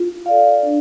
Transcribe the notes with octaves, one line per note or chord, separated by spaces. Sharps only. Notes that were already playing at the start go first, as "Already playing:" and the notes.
Already playing: F4
A4 D5 F5
D4